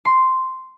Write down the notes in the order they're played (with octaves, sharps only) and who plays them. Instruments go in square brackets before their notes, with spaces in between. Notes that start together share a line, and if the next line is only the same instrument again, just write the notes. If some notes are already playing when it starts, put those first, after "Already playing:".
[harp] C6